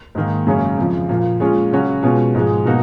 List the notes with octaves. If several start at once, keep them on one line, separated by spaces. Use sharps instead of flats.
G#2 D#3 A#3
F#2 C#3 G#3 C#4
F2 C#3 F3
A#2 F3 A#3
A#2 G#3 C#4 F4
C#3 F#3 C#4 F#4
B2 G#3 C#4 F4
G#2 F3 G#3
B2 A#3 D#4 F#4